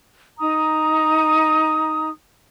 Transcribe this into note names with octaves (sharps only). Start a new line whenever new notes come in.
D#4 A#5 D#6